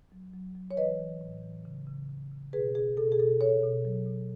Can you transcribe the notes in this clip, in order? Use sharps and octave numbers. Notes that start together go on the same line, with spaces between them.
F#3
F#3
F#3
C#5
E3 B4 D#5
E3
A2
E3
C#3
C#3
C#3
C#3
B2 G#4 B4
B2 G#4
B2 A4
G#4
B2 A4
B2 A4 C#5
B2
F#3
B2